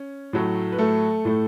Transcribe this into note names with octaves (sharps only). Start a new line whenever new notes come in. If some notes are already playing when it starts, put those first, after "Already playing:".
Already playing: C#4
A2 F#3 A3
B4
A3 A4
A2 A3